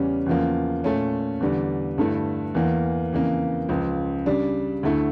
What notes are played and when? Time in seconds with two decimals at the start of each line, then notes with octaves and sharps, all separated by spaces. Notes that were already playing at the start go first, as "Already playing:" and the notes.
Already playing: E2 C#3 G3 C#4
0.26 E2 C#3 F3 A#3
0.84 A#2 A3 C#4
1.40 E2 D3 G3
1.98 G2 D3 A3 E4
2.55 E2 E3 A#3
3.12 F2 C#3 E3 A#3
3.69 C#2 C#3 F3
4.26 C#3 G3 D4
4.83 D2 D3 A3 E4